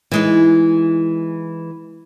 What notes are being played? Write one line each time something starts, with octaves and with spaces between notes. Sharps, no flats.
E3 G#3 D#4